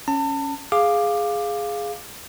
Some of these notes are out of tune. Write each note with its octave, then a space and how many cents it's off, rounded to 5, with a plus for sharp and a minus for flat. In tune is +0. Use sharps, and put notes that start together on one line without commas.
C#4 +0 A5 +40
G#4 +0 F5 +0 D6 +10